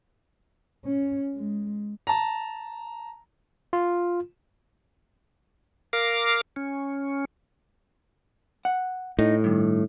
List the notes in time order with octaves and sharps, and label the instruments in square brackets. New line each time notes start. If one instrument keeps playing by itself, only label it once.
[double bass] C#4
G#3
[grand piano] A5 A#5
[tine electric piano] F4
[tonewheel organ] A#4 F5 D6
C#4
[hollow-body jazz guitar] F#5
[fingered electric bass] A2 [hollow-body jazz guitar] D#4
[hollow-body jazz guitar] G2 D#3